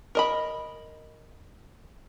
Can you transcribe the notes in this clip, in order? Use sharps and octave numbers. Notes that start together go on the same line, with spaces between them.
A#4 D#5 B5